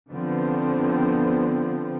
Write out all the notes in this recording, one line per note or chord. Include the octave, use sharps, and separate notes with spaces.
D3 F3 B3 C4